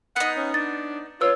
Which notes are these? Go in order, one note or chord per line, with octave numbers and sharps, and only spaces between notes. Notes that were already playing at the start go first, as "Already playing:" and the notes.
B3 D#4 F#5
C#4
D4 A6
F4 B4 C#5 E6